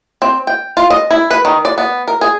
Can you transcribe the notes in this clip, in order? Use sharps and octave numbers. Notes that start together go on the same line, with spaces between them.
C4
G5
F4
D#5
E4
B4
D#3
D5
B3
A#4
G#4